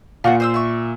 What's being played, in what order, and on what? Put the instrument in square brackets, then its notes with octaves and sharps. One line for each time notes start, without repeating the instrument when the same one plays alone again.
[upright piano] A#2 [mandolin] F4 F#4 F#5
[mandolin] C5 D#6 E6
E5 C#6